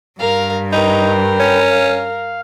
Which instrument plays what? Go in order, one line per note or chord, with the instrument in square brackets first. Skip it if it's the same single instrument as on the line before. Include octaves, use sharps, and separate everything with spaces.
[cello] G2 [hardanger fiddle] A#4 F5
[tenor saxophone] D#4 [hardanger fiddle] A#4 [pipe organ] B4 G5
[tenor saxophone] C#4
[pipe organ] F5